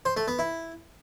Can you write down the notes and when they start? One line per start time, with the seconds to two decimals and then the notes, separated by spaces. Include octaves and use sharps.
0.05 C5
0.17 A3
0.28 B3
0.39 E4